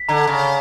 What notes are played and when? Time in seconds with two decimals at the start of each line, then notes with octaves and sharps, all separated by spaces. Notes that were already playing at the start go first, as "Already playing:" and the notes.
Already playing: B6
0.09 D3 A#5
0.27 C#3